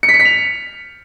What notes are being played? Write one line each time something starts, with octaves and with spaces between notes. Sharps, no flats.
C#7
B6
C#7
B6
F7